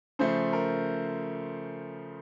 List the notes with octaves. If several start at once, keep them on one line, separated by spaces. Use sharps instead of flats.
C#3 F3 A3 C5
A#4